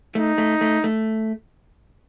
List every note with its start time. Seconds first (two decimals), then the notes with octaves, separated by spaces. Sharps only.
0.15 A3 D#4
0.38 A3
0.61 A3
0.84 A3